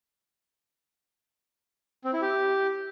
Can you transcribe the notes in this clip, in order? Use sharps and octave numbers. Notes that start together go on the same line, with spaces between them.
C4
E4
G4